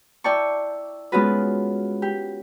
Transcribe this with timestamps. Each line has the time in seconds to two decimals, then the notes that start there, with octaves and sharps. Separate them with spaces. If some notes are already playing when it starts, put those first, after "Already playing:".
0.24 E4 D5 G5 A5 C#6
1.12 G#3 B3 C#4 F4 F#4 B4
2.02 G4